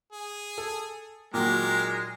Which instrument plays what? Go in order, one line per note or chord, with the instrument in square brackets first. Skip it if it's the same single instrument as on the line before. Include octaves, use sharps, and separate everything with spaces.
[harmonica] G#4
[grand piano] A4
[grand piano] A#2 D#3 F#3 [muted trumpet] G#3 [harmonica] G4 A#4